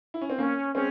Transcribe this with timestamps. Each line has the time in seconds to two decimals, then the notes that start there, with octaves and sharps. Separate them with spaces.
0.14 E4
0.21 C#4
0.30 C4
0.38 A#3 C#4
0.75 G#3 C4 C#4